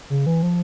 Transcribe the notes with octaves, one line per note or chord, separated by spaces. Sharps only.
C#3
E3
F3